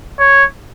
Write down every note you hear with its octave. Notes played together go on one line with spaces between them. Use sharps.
C#5